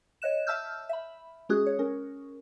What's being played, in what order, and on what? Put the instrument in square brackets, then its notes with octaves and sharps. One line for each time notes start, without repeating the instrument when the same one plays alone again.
[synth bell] C#5 D#5 F#6 E7
E5 A5 E6 F6 G6
E5 B5
G#3 C#4 F#4 G#4 D#6 F#6
C#5
C#4 A#4